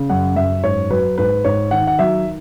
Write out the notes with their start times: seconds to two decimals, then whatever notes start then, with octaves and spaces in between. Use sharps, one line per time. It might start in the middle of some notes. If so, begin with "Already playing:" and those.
Already playing: C#3
0.10 F#2 F#5
0.36 F#2 E5
0.64 G#2 C#5
0.90 F#3 B4
1.18 G#2 B4
1.44 G#2 C#5
1.71 D#3 F#5
1.87 F#5
1.99 F#3 E5